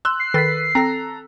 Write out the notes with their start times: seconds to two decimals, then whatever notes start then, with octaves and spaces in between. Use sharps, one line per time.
0.05 C6 E6 F#6
0.20 C7
0.34 D#3 A4 B4 F#6 A6 B6
0.75 C4 A4 A#5 A#6